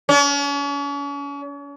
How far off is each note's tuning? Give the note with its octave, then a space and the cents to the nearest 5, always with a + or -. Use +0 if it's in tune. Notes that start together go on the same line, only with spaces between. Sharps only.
C#4 +40